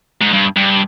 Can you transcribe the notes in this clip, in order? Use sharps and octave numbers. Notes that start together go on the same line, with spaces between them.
G#2
G2
G2